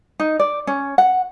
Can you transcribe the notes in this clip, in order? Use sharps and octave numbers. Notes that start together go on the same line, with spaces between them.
D#4
D5
C#4
F#5